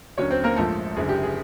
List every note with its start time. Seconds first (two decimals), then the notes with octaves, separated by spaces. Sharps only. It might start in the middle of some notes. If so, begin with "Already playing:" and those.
0.18 D#2 D3 F#3 C#4 C#5
0.30 C4 C5
0.44 A#3 A#4
0.56 A#1 G#2 F3 A3 A4
0.96 F#1 F#2 D3 G#4
1.09 G4
1.23 G#4